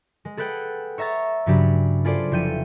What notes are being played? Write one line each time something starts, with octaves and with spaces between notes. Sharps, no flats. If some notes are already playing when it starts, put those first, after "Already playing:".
G#3
G#4 A4 B4 F#5 G5
C#5 E5 A#5 E6 A6
G2 C#3 F#3 D4 G4 B5
F4 G#4 A4 B4 C5 D5
F1 F3 E4 G5 C#7 D#7